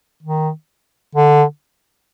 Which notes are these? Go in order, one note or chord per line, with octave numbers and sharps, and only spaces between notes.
D#3
D3